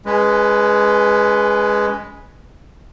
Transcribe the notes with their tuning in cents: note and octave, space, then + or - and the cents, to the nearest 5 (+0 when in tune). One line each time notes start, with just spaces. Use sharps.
G#3 +0 C#4 +30 B4 +0